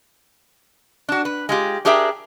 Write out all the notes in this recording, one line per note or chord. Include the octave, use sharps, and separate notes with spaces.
D4 F#4
B4
G#3 F4 G4
D4 G4 G#4 A#4 E5 G5